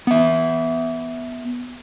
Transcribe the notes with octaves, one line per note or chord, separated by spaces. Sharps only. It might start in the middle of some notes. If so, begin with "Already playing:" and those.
B3 E5